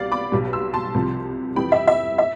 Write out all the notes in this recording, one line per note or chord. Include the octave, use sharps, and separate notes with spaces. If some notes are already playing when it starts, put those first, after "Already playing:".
Already playing: C2 B2 G3 D5 F5
B5 D6
B1 B2 G3
C6 E6
A5 C6
C2 C3 F3
F2 E3 G3 G5 B5
E5
E5
E5